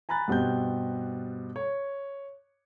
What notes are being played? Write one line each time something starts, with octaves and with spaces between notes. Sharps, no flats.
G#5 A#5 B5 F#6 A6
G2 B2 C4 G4 G6
C#5